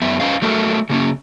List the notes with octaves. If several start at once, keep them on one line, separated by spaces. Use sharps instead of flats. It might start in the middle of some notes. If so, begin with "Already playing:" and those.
F#2 B3 E5
C#4 B4 C5 D#5 F5
F#3 A3 A4 A#4 E5
C#3 A#3 C#4